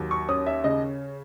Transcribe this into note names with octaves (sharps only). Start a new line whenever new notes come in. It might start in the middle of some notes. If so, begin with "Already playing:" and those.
Already playing: D#2 F#3
C#6
C#4 D#6
E5
C#3 D#5